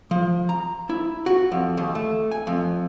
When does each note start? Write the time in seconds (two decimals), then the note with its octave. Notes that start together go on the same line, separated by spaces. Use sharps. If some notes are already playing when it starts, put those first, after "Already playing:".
0.11 F3
0.49 A#5
0.90 E4
1.26 F#4
1.52 F2
1.77 D#2
1.95 A3
2.31 G#5
2.47 F2